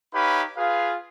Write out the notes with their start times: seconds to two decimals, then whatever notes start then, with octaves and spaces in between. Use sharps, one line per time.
0.14 D#4 G4 B4 C#5 F5 B5
0.57 F4 G#4 B4 F5